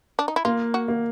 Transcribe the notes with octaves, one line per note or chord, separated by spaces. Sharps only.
D4
D#4
E4
A#3 F4
F#4
A#3